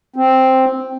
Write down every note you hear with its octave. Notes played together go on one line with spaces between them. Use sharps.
C4